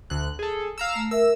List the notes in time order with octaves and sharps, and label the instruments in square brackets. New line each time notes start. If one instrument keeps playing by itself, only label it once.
[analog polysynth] D2 F#6
G#4 A4
F5 A#5 E6
[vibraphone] A3
[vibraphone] A#4 E5 [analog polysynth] E6